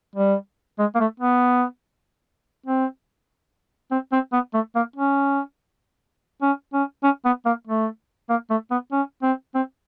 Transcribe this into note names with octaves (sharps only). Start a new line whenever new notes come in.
G3
G#3
A#3
A3
B3
C4
C4
C4
B3
A3
A#3
C#4
C#4
C#4
C#4
B3
A#3
A3
A#3
A3
B3
C#4
C4
C4